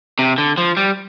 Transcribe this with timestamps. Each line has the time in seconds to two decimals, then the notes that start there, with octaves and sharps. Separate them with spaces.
0.19 C3
0.38 D3
0.58 F3
0.77 G3